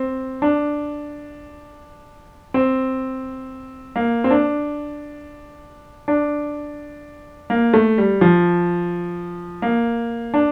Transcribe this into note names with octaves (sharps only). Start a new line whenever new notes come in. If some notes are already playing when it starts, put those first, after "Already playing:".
Already playing: C4
D4
C4
A#3
C4
D4
D4
A#3
A3
G3
F3
A#3
D4